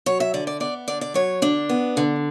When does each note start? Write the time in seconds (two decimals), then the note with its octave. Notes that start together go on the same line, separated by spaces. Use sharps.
0.06 F#3 C#5
0.20 E5
0.34 D3 D5
0.47 D5
0.60 B3 D5
0.88 D3 D5
1.01 D5
1.14 F#3 C#5
1.42 D3 D4
1.69 B3
1.97 D3